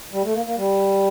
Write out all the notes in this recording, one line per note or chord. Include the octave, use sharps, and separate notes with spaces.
G3
A3
A#3
A#3
G3